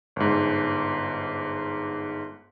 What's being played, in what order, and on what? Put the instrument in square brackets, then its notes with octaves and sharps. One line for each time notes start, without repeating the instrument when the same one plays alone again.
[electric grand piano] G1 G#2